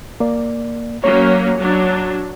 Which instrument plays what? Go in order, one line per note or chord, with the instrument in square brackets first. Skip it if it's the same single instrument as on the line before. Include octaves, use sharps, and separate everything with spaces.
[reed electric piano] A#3 D5
[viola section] F#3 A#3 C#4 [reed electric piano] C#5
[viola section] F#3 D4